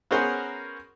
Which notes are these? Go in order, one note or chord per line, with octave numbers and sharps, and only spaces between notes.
B3 C#4 F#4 G#4 A#4 C5